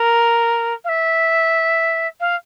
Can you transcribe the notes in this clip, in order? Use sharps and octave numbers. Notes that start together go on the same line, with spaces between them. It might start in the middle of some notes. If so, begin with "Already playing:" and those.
Already playing: A#4
F5
E5
F5